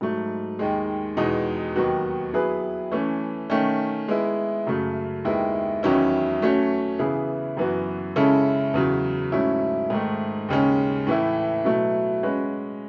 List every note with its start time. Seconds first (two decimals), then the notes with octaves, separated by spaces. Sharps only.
0.01 G#2 F#3 A3
0.59 D#2 D#3 G#3
1.17 E2 B2 G#3 D#4
1.76 D#2 D#3 F#3 B3 F#4
2.33 F#3 B3 E4 G#4 B4
2.91 E3 A3 C#4
3.50 D#3 A3 C#4
4.08 G#3 B3 E4
4.67 F#2 C#3 F#3 A3
5.24 D#2 D#3 G#3 B3 E4
5.83 E2 D#3 F#3 C#4 E4
6.41 F#3 A3 C#4 F#4 C#5
6.99 C#3 E3 B3 E4 G#4
7.57 F#2 E3 B3 F#4
8.16 C#3 G#3 C#4 E4 A4
8.74 E2 C#3 F#3
9.32 G#2 F#3 A3 C#4 E4
9.90 G#2 D#3 A3
10.48 D#2 C#3 G#3 C#4
11.07 A2 E3 A3 E4
11.65 B2 F#3 A3 E4
12.23 G#3 C#4 F#4 B4